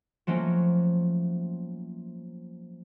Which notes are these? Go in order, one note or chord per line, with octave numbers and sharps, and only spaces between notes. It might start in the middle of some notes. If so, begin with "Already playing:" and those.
F3 F#3 A3 A#3 C#4